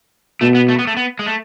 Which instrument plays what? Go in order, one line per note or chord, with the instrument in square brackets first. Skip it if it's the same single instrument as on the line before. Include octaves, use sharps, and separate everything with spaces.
[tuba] B2 [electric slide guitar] A3
[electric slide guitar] B3
A3
B3
A3
B3
G#3
A3